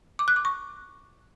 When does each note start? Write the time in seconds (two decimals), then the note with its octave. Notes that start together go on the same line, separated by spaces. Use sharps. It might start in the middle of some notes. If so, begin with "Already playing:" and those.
0.19 D6
0.28 F#6
0.36 D6
0.45 C#6